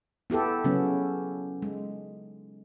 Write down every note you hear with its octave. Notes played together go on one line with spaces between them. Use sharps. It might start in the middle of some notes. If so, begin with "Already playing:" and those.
B3 E4 G4 A4
C#3 F#3 B3 C#4
G#3